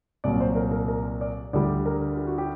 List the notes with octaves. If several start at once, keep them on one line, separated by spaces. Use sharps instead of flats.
C2 A#2 F#3 D5
C5
A#4
A#4
A#4
D5
D2 D3 G3 D5
A#4
G4
F#4
G4